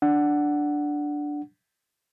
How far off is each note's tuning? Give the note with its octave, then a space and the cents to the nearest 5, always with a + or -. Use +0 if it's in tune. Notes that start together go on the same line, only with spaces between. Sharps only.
D4 +0 F#5 +0